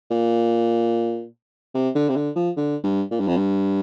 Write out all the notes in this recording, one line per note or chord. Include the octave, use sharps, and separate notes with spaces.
A#2
C3
D3
C3
D3
F3
D3
G2
A#2
G2
F2
G2